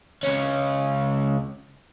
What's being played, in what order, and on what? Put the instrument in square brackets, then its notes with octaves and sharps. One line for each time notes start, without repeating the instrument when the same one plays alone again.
[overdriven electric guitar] C#2 C#4